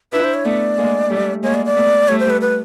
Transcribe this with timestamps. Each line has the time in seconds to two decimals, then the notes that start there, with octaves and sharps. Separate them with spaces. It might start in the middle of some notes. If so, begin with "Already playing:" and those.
0.13 D4 E4 B4
0.24 C5
0.34 C#5
0.45 A3 B3 D5
0.78 G#3 A#3
1.10 G3 A3
1.43 G#3 A#3 C#5
1.54 D5
1.66 D5
1.76 A3 B3
2.08 G3 A3 C#5
2.20 C5
2.30 B4
2.41 B4